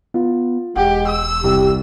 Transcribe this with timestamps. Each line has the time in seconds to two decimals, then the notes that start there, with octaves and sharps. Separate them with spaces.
0.14 B3 F4
0.76 E1 G#3 G4 F#5
1.07 E6
1.44 C2 G4